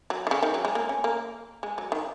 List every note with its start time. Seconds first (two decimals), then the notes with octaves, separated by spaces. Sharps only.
0.10 F#3
0.27 D#3
0.31 C#3
0.43 D#3
0.54 F#3
0.65 G#3
0.75 A#3
0.89 C#4
1.04 A#3
1.63 G#3
1.78 F#3
1.92 D#3